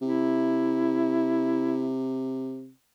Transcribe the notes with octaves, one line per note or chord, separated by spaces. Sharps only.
C3 E4